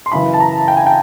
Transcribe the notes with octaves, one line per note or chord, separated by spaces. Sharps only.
C6
F#2 C#3 E3 B5
A5
A#5
G5
G#5
G5